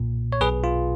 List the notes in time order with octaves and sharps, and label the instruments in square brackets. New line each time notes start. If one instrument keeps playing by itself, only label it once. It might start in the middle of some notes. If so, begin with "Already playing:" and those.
Already playing: [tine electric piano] B1 A#2
C#5
B1 B2 G#4 B4
F4